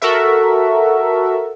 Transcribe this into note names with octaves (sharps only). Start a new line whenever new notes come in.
F#4 A4 A#4 E5